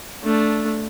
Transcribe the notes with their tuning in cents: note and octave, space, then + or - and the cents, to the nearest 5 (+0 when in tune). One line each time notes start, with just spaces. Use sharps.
A3 +0 D4 -10